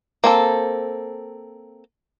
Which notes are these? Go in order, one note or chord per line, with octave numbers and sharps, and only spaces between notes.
A#3 C4 A4